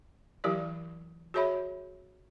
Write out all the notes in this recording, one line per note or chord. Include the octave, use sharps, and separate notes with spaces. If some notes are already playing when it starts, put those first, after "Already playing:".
E3 F#3 E4 G4 A#4 D5
F#4 G#4 C#5 E5 B5